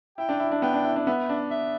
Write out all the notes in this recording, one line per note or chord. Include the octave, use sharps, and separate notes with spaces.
E4 G5
D4
E4
D4
B3 G5
D4
E4
D4
B3 E5
D4
E5